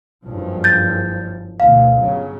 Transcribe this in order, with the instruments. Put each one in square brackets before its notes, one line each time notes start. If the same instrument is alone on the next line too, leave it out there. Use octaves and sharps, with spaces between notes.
[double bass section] F#1 G2 F3
[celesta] G6 A6
[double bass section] D2 B2 E3 [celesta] F5
[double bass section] G1 C#3 F#3